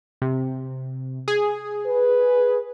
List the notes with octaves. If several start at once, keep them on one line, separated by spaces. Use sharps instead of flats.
C3
G#4
B4